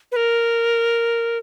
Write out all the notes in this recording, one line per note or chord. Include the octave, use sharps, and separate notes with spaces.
B4
A#4